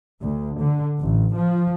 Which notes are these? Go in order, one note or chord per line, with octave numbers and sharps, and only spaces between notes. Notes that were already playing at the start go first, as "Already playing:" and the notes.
D2
D3
A1
F3